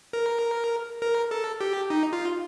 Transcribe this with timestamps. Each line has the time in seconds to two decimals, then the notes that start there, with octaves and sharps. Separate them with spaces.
0.13 A#4
1.02 A#4
1.31 A4
1.61 G4
1.90 D#4
2.13 F4